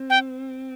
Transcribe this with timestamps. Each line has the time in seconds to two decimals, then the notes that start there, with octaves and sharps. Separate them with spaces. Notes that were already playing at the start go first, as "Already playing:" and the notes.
Already playing: C4
0.10 G5